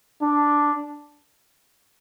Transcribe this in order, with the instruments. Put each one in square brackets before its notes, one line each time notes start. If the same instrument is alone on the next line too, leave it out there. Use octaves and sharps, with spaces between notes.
[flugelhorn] D4